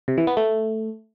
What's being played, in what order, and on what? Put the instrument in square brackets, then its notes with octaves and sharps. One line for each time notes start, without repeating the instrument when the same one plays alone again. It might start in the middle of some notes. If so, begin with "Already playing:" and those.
[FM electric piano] C3
E3
B3
A3